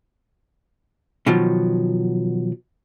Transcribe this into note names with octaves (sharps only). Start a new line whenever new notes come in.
B2 D#3 F3 F#3